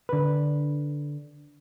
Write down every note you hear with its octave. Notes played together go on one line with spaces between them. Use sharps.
D3 B4